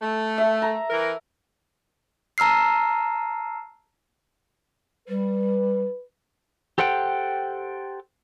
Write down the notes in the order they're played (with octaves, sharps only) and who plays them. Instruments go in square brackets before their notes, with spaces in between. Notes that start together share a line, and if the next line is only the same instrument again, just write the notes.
[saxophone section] A3
[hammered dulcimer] A4 E5
A#5
[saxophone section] E3 A#4
[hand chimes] A5 A#5 E6 F6 C7
[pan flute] G3 [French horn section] B4
[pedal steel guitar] G4 A4 C5 F#5 G5